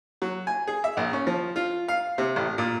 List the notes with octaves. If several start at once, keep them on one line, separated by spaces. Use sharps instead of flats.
F#3
G#5
G#4
E5
A#1
C#4
F3
F4
F5
C3
A1
A#2